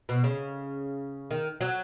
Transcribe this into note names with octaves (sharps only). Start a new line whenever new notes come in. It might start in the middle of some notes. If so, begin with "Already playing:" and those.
B2
C#3
D#3
F#3